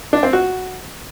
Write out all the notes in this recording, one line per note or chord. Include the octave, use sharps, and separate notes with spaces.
D4
C4
F#4